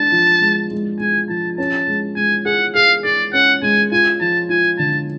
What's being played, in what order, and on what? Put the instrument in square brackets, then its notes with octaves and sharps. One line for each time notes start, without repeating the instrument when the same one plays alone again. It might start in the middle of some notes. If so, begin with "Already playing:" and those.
Already playing: [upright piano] G#3 D4 [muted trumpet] A5
[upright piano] F3
G#3
G#3
[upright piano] G#3 [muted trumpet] G#5
[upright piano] F3 [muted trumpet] A5
[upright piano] C#4 [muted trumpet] A5
[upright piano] G#3
[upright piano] G#3 [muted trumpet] G#5
[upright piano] G#4 [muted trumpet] F#5
[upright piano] G#4 [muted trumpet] F5
[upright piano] G#4 [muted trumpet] D5
[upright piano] C#4 [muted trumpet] F#5
[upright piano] G#3 [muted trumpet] G#5
[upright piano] F4 [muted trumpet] G#5
[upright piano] F3 [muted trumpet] A5
[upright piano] F4 [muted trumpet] G#5
[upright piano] D3 [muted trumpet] A5